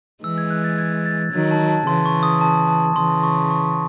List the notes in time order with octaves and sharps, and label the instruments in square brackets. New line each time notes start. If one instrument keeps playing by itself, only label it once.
[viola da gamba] E3 G#3 [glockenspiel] E6
[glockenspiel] G#6
F#6
A6
G#6
A6
[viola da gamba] D#3 F#3 [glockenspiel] G#6
[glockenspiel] A5
A5
[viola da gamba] C#3 E3 [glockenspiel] C6
[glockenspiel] C#6
D#6
A5
A5
[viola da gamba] C#3 E3 [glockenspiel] C6
[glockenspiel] C#6
C#6